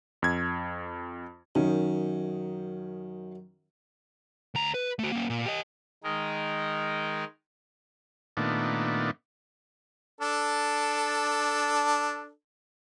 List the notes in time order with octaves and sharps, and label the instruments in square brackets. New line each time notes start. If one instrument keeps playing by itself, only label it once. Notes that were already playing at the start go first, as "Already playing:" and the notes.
[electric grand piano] F2 G#6
[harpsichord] F#2 [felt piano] D#3 C#4 D#4
[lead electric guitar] D2 A#5
B4
A3 F#4
A#3 C#4
A#2
G4 D#5
[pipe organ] D#3 G#3 D#4 A#4
[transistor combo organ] A#2 D#3 A3 B3 D4
[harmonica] D4 A4